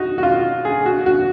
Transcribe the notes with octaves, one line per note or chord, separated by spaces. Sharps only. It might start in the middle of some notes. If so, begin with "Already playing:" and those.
Already playing: D#4 F#4
F#4
F4
G#4
F#4
F#4